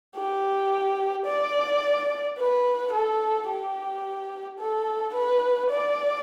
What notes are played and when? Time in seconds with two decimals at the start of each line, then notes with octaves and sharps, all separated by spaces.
0.16 G4
1.26 D5
2.38 B4
2.92 A4
3.48 G4
4.59 A4
5.14 B4
5.70 D5